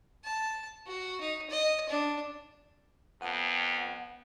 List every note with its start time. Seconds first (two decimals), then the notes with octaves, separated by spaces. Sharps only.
0.24 A5
0.86 F#4
1.21 D#4
1.50 D#5
1.89 D4
3.22 F2 B3